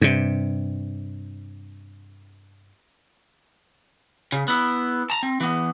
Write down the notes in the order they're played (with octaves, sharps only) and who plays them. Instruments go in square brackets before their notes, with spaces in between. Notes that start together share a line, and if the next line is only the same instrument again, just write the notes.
[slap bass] G2 C3
[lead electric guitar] C#3
B3 E4
A5 A#5
C4
E3 B3